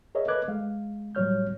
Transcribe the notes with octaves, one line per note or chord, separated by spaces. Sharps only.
G#4 A#4 C#5 D#5 E5
A4 B4 D#5 D6 F#6 G#6
G#3 F5
A2 F#3 G3 C#5 F6 G6